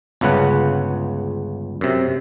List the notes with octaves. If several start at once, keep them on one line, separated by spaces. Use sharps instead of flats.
G1 C#2 C#3 B3 F#5
F#2 C3